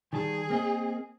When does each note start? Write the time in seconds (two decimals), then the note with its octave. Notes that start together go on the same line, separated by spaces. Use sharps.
0.13 D#3 G3 G#4 A5
0.50 A#3 C4 D#5